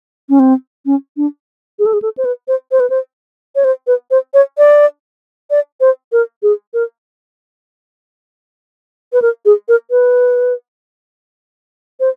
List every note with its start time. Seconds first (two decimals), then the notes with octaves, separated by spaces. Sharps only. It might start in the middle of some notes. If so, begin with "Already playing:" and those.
0.29 C#4
0.39 C4
0.86 C#4
1.17 D4
1.79 G#4
1.86 A4
1.93 G#4
2.02 A4
2.18 C5
2.25 B4
2.48 C5
2.72 C5
2.80 B4
2.90 C5
3.56 C#5
3.64 C5
3.87 B4
4.11 C5
4.34 C#5
4.58 D5
5.50 D5
5.81 C5
6.12 A#4
6.43 G#4
6.74 A#4
9.13 B4
9.22 A#4
9.45 G#4
9.68 A#4
9.91 B4
12.00 C5